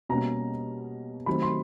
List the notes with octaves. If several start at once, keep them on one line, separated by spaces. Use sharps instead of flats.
B2 G3 A#3 C#4 A#5
D#3 F#3 A3 C4 B5
C6